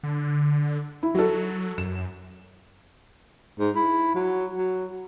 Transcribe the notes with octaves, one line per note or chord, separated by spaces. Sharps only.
D3
E4
F#3 F#4 A4
F#2 E7
G#2
E4
F#3
F#3